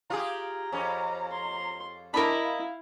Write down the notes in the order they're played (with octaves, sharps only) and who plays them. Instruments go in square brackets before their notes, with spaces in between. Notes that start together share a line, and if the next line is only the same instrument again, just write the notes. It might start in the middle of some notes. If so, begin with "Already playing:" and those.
[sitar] F4 G4 G#4 [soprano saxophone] A#5
[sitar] F2 C#4
[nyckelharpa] C6
[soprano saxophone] D4 [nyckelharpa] E4 [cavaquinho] A#4 D#5 B5
[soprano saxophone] F5